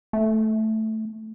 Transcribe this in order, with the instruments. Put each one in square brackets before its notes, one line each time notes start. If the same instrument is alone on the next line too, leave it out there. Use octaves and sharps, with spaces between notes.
[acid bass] A3